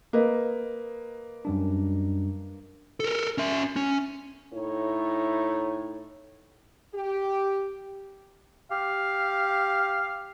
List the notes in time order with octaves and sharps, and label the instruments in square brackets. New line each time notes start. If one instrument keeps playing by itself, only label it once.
[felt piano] A#3 B4 D#5
[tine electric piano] F#2 G3 D4
[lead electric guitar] A4 A#4
C#4 E5
C#4
[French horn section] A2 D#4 E4 C#5
G4
[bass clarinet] G4 [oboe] F5